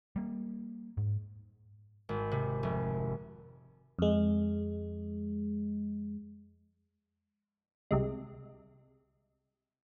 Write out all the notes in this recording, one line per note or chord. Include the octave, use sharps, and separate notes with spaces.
G3 A#3
G#2
G#1
C3
F1
F2 G#3
C2 C3 G#3